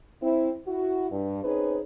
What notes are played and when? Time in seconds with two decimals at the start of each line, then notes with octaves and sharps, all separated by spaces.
0.22 C4 E4
0.67 E4 F#4
1.10 G2
1.44 C4 C#4 D#4 G#4 B4